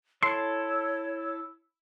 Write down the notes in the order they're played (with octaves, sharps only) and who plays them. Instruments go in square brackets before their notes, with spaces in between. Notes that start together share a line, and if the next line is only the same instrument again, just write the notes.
[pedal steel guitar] E4 A4 [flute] C#5 [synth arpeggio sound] C6